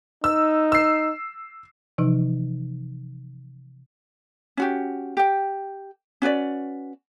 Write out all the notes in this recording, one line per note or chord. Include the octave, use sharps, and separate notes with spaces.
D#4 E6
E6 C7
C3 E3 F3 D#4
C#4 F#4 G4
G4 G5
C#4 F#4 B4 D5